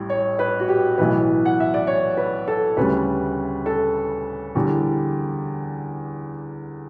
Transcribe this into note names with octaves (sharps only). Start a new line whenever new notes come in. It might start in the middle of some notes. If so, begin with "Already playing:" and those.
Already playing: A1 A2 G3
C#5
B4
F#4
G4
B1 A2 E3 B4
F#5
E5
D5
C#5
B4
A4
D2 C#3 G3 B4
A4
E2 D3 G3